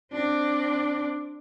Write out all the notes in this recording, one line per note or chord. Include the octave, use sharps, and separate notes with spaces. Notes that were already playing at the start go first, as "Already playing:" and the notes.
C4 D4